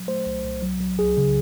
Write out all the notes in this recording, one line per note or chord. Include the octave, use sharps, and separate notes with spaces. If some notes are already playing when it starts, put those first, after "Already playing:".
Already playing: F#3
A3 C5
C2
C2
F#3
F#3
C#2 G#4
C#3